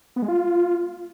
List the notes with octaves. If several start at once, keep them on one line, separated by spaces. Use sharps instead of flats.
B3
G#3
F4